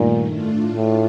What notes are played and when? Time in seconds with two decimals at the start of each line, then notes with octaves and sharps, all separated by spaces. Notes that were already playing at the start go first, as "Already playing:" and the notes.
Already playing: G2 A#2 D#3 A3
0.29 A2 A3 D4 F4
0.75 A2